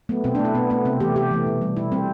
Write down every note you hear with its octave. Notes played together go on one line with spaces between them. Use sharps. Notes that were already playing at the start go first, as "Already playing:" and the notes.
F#3 A3 B3
B2 C4
D4
A3
E4
B2 B3
A3 B3
C3 C4
E3 A3 G4
C3 G4
E3 A3
B2
G3
B2 E4
G3 C4